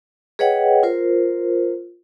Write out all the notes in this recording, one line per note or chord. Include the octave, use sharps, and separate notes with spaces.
G#4 B4 C#5 D#5 F#5 G5
F4 A#4 C5